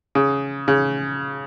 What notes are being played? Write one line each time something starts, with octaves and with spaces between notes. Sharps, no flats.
C#3
C#3